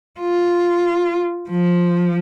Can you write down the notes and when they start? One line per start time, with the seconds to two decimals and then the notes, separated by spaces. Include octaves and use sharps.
0.21 F4
1.50 F3